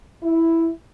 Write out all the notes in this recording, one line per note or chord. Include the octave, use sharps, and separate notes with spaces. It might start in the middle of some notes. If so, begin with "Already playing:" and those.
E4